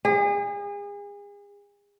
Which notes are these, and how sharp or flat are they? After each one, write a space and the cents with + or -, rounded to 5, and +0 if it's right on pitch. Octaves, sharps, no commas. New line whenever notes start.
G#4 -35